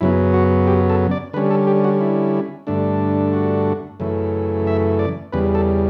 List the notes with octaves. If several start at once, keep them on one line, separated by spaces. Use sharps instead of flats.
F#2 C#3 F#3 B3 E4
F#4
G4
A4
D5
D3 G3 C#4 B4
A4
G4
F#4
E4
G2 D3 A3 D4
F#4
F#2 C#3 E3 A3
E5
D5
E2 C#3 G3 B4
A4